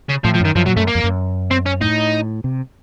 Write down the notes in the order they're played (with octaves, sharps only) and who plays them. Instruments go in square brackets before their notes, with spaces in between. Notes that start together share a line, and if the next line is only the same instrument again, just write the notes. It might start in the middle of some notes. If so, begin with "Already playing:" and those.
[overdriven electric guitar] C#3
[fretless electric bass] A2 [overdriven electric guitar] F3
[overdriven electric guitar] F3
[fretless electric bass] F#2 [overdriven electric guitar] D#3
[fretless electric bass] F#2 [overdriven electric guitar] F3
[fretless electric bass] A#2 [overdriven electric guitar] F#3
[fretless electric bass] F#2 [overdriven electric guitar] A3
[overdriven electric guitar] A#3
[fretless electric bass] F2
F#2
[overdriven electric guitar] C4
C#4
[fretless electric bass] A2 [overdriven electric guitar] D#4
[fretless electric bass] C3